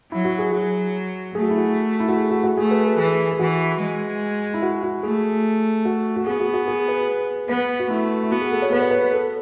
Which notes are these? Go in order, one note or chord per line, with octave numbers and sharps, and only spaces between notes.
F#3 E4
F#4
G#4
F#3 F#4
A3 G#4
F#4
E4
F#4
E4
F#4
G#4
F#4
F#4
A3 G#4
B4
A4
E3 G#4
G#4
E3 F#4
G#3
E4
F#4
F#4
A3 G#4
F#4
F#4
B3 G#4
F#4
F#4
G#4
B4
B3 B4
F#4
A3 E4
E4
B3 F#4
G#4
A4
C#5
B3 B4
C#5
B4
A4